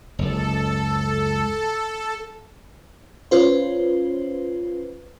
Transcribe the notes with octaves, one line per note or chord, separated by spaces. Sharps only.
F#1 C#2 A4
C#4 F4 B4 C5